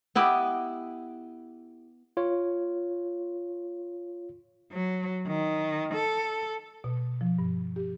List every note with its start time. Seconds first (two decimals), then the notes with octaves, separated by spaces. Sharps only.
0.15 B3 E4 G4 D#5
2.17 F4 C#5
4.72 F#3
5.27 D#3
5.94 A4
6.84 B2
7.21 F3
7.39 G2
7.76 G4